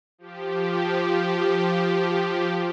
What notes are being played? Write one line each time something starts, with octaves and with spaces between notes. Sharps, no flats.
F3 G4